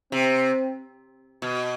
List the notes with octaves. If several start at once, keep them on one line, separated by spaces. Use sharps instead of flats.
C3 C4
B2